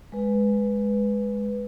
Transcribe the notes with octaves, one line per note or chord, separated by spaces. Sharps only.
G#3 B4